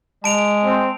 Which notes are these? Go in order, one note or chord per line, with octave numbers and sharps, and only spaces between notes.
G#3 A5 D7 F7
C4